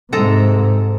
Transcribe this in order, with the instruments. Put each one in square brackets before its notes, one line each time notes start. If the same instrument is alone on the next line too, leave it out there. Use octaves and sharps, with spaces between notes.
[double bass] G#2 C3 [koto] G#3 A4 A#5